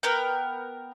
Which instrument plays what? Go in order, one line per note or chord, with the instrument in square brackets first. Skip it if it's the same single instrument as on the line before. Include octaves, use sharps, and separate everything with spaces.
[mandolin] B3 A#4 G5